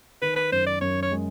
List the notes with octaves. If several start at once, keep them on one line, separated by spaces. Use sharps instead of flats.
D#3 B4
B4
F#2 C5
D5
F#2 C#5
C#5
G#3